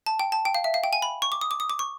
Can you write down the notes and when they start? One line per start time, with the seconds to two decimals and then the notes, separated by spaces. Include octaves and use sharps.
0.06 A5
0.20 G5
0.32 A5
0.45 G5
0.55 F5
0.64 E5
0.74 F5
0.84 G5
0.93 G#5
1.02 B5
1.22 C#6
1.32 D6
1.41 D#6
1.51 D6
1.60 D#6
1.70 D6
1.79 C#6